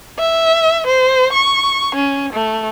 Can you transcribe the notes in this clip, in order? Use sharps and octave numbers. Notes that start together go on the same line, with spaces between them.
E5
C5
C#6
C#4
A3